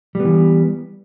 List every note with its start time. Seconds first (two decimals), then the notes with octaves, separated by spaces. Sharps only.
0.15 G3
0.20 B3
0.25 E3